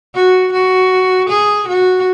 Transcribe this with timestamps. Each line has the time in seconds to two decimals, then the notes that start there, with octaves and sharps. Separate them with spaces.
0.15 F#4
0.53 F#4
1.29 G#4
1.68 F#4